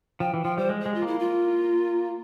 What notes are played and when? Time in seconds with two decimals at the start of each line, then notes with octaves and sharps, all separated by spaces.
0.20 F3 G5
0.34 E3
0.45 F3 G5
0.58 G3 C5
0.69 G#3
0.82 G#3 G#4
0.94 F4
1.02 A#3 E4
1.19 F4